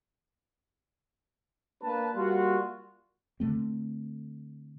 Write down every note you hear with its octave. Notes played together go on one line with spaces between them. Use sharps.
A#3 D4 B4 A5
G3 A#3 F4 F#4
D3 F3 A3 C4